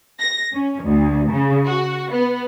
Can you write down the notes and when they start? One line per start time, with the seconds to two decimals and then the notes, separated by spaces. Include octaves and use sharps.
0.19 A#6
0.53 C#4
0.82 D2
1.31 C#3
1.65 F#4
2.11 B3